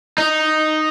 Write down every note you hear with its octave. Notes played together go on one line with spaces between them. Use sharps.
D#4